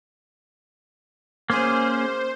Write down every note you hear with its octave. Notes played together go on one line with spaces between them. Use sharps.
A#3 C#4 G#4 C5